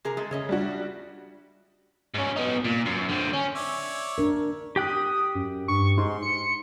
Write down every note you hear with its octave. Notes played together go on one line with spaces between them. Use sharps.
C3 G#4 A#4
G#3 A3 G#4
C#3 C#5 D#5 E5
G3 D4 F#4
G#2 C#4
B3 D#4
A#2
F#2
D3 C4
C#4
C#5 D5 E5
D4 A#4
G4 G5 D#6 F#6
F#2
G2 C#6
G#2 C6
C#7